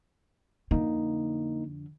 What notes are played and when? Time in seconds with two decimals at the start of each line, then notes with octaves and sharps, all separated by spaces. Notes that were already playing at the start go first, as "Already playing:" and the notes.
0.71 F2 D3 A#3 D#4